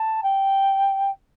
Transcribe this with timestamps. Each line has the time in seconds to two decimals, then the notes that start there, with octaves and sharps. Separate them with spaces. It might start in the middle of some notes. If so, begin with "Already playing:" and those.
Already playing: A5
0.23 G5